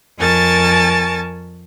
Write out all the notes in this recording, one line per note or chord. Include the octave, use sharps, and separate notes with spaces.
F2 A#4 G#5 A5 C#6 A6